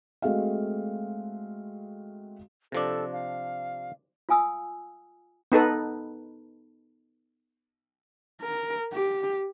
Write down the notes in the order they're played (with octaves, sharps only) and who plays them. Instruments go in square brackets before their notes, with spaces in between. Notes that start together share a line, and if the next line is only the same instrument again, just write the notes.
[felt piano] G#3 A3 C4 F#4 G#4 F5
[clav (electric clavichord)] C3 F3 D4 [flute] A4
[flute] F5
[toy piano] F4 F5 G#5 D#6 E6
[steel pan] B3 D#4 A4 B4
[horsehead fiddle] A#4
G4